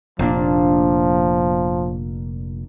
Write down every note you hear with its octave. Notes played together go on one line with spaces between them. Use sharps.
F1 A#2 F3 A#3 D4